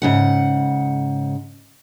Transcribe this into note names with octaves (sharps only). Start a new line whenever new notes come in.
G#2 C#3 F#5